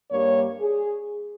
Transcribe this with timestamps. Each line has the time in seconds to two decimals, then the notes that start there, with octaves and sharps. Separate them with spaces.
0.11 G2 G3 A#3 C#5
0.60 G#4